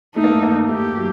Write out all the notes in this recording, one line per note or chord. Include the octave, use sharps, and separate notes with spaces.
A3 D#4
A#3
A3
A#3
A3 G4
F#3